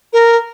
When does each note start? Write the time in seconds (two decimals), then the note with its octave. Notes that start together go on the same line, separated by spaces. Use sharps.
0.13 A#4